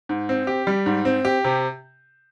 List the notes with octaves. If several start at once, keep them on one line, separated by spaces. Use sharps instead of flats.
G#2
C4
G4
G3
G#2
C4
G4
C3